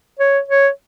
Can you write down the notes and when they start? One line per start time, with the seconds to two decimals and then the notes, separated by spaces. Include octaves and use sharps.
0.19 C#5
0.48 C#5